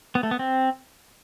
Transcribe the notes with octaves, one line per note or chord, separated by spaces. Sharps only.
B3
A3
B3
C4